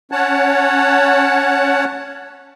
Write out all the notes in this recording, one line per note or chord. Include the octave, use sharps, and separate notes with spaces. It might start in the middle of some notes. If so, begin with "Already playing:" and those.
C#4 C#5 F#5 A5